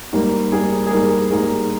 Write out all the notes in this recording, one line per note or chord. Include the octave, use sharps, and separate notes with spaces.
G#2 G3 A#3
G#2 G3 A#3 G#4
G#4
G#2 G3 A#3 A#4
G#2 G3 A#3 G#4